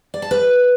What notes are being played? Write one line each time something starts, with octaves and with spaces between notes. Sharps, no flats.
D5
A5
B4